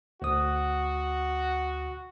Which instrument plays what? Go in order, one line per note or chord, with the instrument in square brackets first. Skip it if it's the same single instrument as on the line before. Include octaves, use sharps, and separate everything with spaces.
[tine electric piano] D2 D#6 [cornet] F#4